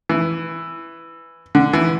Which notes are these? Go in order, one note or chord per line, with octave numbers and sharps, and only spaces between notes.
E3
D3
E3